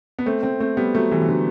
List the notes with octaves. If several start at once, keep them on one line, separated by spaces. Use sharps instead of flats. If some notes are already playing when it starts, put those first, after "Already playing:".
B3
A3 C4
A3 C4
A3 C4
G3 B3
F#3 A3
E3 G3
E3
D3 F#3